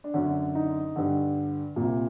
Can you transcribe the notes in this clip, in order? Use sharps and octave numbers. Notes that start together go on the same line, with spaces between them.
D4
F#2 D3 C#4
D#4
G2 D3
C2 A#2